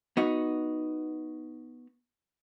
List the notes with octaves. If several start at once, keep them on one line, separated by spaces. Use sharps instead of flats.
B3 D#4 F#4